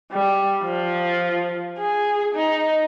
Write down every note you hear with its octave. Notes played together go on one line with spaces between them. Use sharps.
G3
F3
G#4
D#4